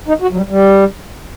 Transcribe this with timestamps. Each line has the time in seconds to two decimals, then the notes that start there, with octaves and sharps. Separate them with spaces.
0.08 D#4
0.22 F#4
0.32 F#3
0.37 G3
0.50 G3